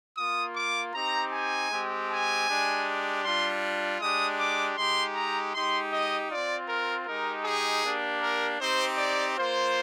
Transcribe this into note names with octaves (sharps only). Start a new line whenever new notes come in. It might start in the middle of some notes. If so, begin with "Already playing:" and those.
A#3 F4 D#6
D6
C4 D#4 G4 A#5
G#5
G#3 C4 G4
G#5
G#3 D4 G4
G3 D4 F4 C6
G#3 D4 G4 D#6
D6
G#3 D#4 G4 C6
A#5
G#3 D#4 G4 C6
D#5
C4 F4 D5
A#4
G#3 D#4 G4 A#4
G#4
A#3 D4 G4
A#4
C4 D#4 G4 C5
D5
A#3 F4 C5